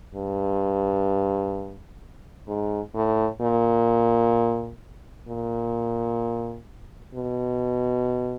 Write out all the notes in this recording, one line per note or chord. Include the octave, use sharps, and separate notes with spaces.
G2
G#2
A2
A#2
A#2
B2